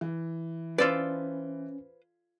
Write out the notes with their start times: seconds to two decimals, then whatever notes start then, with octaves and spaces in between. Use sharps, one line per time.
0.01 E3
0.78 C#4 F4 A4 B4 C5 D5